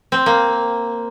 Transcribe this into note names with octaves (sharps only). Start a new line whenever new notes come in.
C4
A#3